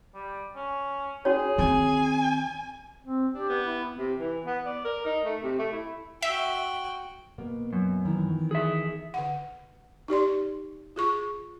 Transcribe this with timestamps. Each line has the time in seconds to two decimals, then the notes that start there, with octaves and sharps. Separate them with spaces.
0.14 G3
0.56 C#4
1.25 C#4 F#4 G#4 C#5
1.58 D#3 C4 G#5
3.04 C4
3.34 D4 G4
3.49 B3
3.66 E4
3.97 C3
4.19 E3
4.46 B3
4.65 D5
4.84 A#4
5.05 D#4
5.24 A3
5.42 C3
5.59 A3
5.72 E4
6.22 F#4 E5 G5
7.38 B2 A#3 B3
7.73 F#2
8.05 D#3 E3
8.51 G#4 E5
9.14 D3 F#5
10.08 D#4 G4 D5 C6
10.96 F4 G#4 C#6